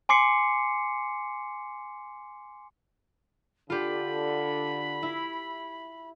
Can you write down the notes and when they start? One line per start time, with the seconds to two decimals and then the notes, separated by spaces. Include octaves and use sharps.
0.09 G#5 C6 D6 C7 C#7
3.70 D3 F4 G4 B5
5.03 E4